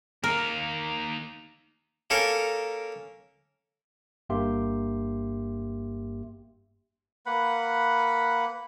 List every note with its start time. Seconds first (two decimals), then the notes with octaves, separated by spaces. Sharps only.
0.24 A#3 D#4 A#4
2.10 A#3 C#4 A4 A#4
4.29 G1 G2 A#3 G4 E5 C6
7.26 A#3 B4 F#5 B5